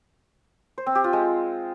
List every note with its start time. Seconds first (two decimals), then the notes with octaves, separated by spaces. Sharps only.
0.78 C5
0.86 C4
0.95 G4
1.04 F4
1.13 G#3